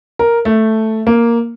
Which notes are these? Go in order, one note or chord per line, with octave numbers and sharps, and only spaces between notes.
A#4
A3
A#3